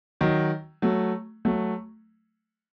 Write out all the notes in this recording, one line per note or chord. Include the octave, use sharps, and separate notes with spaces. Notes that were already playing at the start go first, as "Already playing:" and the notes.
D#3 F#3
F#3 A3
F#3 A3